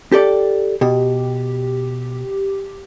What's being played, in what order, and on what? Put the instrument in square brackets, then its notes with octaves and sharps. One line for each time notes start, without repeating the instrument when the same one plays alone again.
[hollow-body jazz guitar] G4 A4 D5
[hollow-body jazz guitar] B2 [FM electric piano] G4